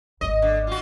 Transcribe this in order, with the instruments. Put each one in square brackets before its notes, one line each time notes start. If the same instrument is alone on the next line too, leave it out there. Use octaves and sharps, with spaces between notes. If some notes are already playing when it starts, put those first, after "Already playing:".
[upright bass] G#1 A#3 [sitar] D#5
[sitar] D3
F4 F#4